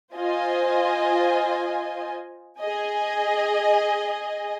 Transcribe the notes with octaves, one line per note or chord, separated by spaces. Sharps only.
F4 C5 D#5 G#5
G#4 D#5 G#5